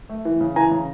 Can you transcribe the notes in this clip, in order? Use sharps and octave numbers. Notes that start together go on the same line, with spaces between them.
A3
E3
C#3
E3 G#5 A#5
C#3